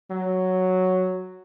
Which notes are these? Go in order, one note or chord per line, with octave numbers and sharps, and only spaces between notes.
F#3